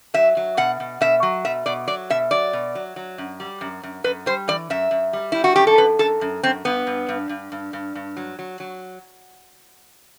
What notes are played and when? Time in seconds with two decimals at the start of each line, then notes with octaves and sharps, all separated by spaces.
0.14 F#3 E5
0.37 F#3
0.57 B2 F#5
0.80 B2
1.01 B2 E5
1.23 F#3
1.45 B2 E5
1.66 B2 D5
1.87 F#3 D5
2.10 B2 E5
2.31 F#3 D5
2.53 B2
2.75 F#3
2.96 F#3
3.18 F#2
3.40 G3
3.61 F#2
3.83 F#2
4.04 F#2 B4
4.26 G3 C5
4.48 E3 D5
4.70 F#2 E5
4.91 F#2
5.13 G3
5.32 G3 E4
5.44 F#4
5.56 F#2 G4
5.67 A4
5.78 F#2 B4
5.99 F#2 A4
6.21 F#2
6.43 F#2 C4
6.65 G2 B3
6.87 G2
7.08 G2
7.29 G2
7.52 G2
7.73 G2
7.95 G2
8.17 F#3
8.39 F#3
8.60 F#3